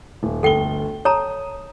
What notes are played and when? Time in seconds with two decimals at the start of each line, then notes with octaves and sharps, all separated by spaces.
0.23 D#1
0.43 G1 D2 A4 G5 G7
1.05 C#5 A5 A#5 D#6